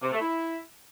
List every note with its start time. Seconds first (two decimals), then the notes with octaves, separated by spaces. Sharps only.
0.02 C3
0.12 A3
0.21 E4